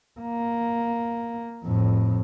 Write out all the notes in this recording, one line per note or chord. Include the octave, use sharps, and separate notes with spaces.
A#3
F2 A2